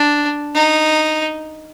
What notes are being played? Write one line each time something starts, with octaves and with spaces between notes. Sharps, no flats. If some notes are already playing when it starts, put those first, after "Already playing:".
Already playing: D4
D#4